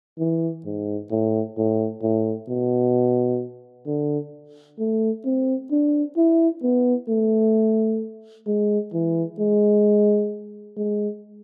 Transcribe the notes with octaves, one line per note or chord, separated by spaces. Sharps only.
E3
G#2
A2
A2
A2
B2
D3
A3
C4
D4
E4
B3
A3
G#3
E3
G#3
G#3